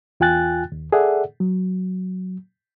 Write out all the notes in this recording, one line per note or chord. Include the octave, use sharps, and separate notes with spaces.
E2 F4 G5 G#5 F#6 A6
D#2
G#4 A4 D5 E5 F#5
F#3